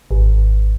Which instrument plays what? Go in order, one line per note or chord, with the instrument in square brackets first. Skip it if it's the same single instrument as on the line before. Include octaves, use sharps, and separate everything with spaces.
[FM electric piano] G#1